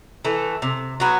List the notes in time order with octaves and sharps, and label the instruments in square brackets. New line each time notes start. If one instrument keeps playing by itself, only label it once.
[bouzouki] E3 A3
C3
F#3 B3 F#4